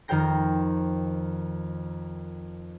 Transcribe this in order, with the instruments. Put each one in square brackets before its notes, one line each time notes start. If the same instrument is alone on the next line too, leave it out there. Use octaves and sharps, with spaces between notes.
[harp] F2 D#3 A#4 C5 G5 A#6